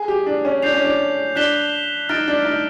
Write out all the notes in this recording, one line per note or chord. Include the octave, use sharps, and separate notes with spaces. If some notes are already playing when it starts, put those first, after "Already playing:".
Already playing: G#4
G4
D4
C#4
D4 G6 C7 F7
C#4
D4
D4 F#6 B6 E7 G7
D#4 F6 A6 D7
D4
D#4